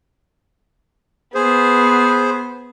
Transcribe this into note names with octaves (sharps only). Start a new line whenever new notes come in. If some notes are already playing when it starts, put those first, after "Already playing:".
B3 G#4 C5